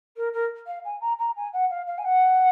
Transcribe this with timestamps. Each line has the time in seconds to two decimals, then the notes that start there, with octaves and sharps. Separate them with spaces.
0.16 A#4
0.33 A#4
0.66 F5
0.84 G#5
1.00 A#5
1.18 A#5
1.36 G#5
1.53 F#5
1.70 F5
1.86 F5
1.98 G#5
2.04 F#5